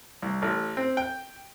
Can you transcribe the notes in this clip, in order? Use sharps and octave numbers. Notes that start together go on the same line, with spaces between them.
C2
A1
C4
G5